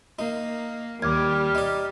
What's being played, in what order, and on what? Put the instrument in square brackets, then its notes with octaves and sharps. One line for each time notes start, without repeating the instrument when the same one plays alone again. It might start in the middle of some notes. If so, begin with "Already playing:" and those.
[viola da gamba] A#3 [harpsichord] D#4
[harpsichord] D#2 [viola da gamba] G3 [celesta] D6 G#6 [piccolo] F6
[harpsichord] D#4 D5